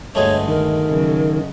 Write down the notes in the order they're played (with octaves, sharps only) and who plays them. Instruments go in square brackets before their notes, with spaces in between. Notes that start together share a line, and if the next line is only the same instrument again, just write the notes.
[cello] D2 G2 [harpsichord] B2 G#3 A3 [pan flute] C#5
[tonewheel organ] D#3 [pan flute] A#4
[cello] C#3 F#3